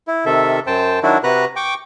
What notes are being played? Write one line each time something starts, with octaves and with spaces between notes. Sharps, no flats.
E4
C3 D#3 A4 E5
F#2 C5 G5 A5
D#3 F#3 D4 E4 F#4
C3 F#4 B4 A#5 F#6
G5 C#6 D6